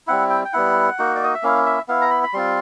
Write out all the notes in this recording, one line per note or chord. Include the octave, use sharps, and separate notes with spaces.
G3 C4 E4 F#5
G5
G5
G3 B3 E4 F#5
A#3 D#4 F#4
D5
D#5
E5
A#3 C#4 E4 F5
E5
B3 E4 F5
A#5
B5
B5
G3 C4 F4 C6